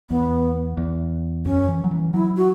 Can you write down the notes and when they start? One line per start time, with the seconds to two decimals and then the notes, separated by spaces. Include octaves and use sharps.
0.10 E2 B3
0.77 E2
1.45 F#2 C#4
1.68 E3
1.84 F#3
1.91 E3
2.14 F#3 E4
2.37 F#4